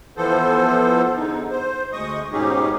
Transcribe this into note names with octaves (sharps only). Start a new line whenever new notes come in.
E3 F3 B3 A4 C5
E2 D3 D#4
C5
D2 G#3 D#5 C#6 D#6
G#2 B2 C#4 D#4 G4 G#4